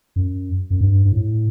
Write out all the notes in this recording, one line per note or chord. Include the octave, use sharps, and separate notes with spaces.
F#2
F#2
G2
G2
A2